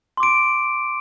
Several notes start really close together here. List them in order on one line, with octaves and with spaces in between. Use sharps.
C6 D6 D7